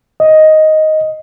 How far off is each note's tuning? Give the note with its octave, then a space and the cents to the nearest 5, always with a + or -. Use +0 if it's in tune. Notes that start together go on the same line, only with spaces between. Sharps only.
D#5 +5